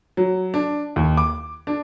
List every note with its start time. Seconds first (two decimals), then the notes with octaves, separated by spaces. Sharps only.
0.17 F#3
0.54 D4
0.96 D#2
1.17 D6
1.67 D4